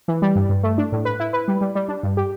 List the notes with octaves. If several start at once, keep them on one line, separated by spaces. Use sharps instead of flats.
E3
G3
G2
G2
A3
D4
A2
B4
E4
B4
G3
G3
G3
D4
G2
G4